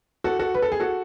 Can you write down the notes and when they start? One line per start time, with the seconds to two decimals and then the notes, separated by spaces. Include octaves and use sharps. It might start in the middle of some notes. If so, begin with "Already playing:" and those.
0.24 F#4 A4
0.39 F#4 A4
0.54 B4
0.62 A4
0.72 G#4
0.80 F#4 A4